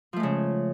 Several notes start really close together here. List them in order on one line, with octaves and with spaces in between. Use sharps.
F3 A3 G#3 C#3